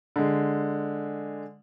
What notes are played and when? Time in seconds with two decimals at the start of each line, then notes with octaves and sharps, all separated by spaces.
0.16 D3 G#3